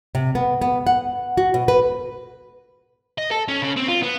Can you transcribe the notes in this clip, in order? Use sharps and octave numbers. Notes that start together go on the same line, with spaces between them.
C3
B3
B3
F#5
F#4
B2
B4
D#5
A4
C#4
C#3
C4
F4
B3